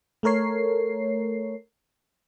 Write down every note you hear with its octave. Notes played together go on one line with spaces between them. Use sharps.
A3 A4 A#4 C#5 C7